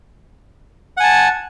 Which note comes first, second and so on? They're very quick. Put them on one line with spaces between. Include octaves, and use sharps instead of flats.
F#5 G#5 A5